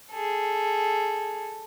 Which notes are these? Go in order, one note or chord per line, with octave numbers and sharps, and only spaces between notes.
G#4 A4